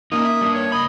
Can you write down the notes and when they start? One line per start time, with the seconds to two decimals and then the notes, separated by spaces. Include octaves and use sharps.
0.12 A#3 C#4 D#4 D#6
0.25 E5
0.41 G3 D4
0.54 C#5
0.72 C#2 D#5 B5